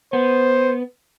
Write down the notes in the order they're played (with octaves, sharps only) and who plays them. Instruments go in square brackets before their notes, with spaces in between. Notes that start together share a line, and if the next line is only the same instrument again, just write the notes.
[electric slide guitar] B3 [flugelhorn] C5